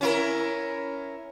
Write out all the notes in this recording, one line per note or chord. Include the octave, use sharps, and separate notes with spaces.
C#4 E4 A#4